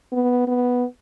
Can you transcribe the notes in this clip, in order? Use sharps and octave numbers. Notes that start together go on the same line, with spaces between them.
B3
B3